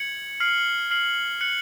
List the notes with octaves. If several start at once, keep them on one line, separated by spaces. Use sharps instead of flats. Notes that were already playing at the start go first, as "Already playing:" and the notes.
Already playing: G#6 C#7 F#7
F6 C7 F#7
F6 C7 F#7
F#6 C#7 F#7